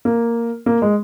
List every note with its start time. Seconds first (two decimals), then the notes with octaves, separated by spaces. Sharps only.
0.05 A#3
0.66 A#3
0.82 G#3